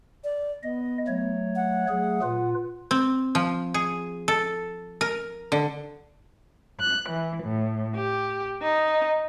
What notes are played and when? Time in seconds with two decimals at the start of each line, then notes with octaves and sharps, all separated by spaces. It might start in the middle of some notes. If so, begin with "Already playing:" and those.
0.24 D5
0.63 B3 D#5
1.08 F#3 A3 C#5
1.56 F#5
1.89 F#3 A3 G#4
2.22 A#2 F4 B4
2.91 C4
3.35 F3
3.74 G#4
4.28 A4
5.01 A#4
5.52 D3
6.81 F#6
7.10 E3
7.44 A2
7.95 G4
8.62 D#4